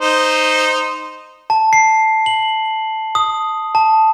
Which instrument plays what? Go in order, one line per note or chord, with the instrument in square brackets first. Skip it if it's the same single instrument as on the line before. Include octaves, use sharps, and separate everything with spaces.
[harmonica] D#4 C5
[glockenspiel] A5
C7
F#7
D#6
A5